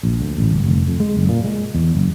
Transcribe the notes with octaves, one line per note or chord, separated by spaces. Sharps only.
A#1
D2
A1
G1
F1
F2
G#3
F#1
A#2
G#3
E2
F#1